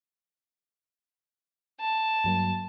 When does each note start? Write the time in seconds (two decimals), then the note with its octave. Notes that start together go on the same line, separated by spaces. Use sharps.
1.80 A5
2.24 G2 F#3 A#3